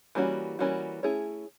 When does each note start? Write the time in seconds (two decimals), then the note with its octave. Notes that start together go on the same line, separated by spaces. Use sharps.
0.15 E3 G3 A#3 C#4 F#4
0.59 E3 G3 A#3 C#4 F#4
1.03 A3 C#4 E4 G#4 C#5